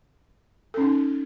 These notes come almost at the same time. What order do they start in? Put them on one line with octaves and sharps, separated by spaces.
A4 C#4 D#4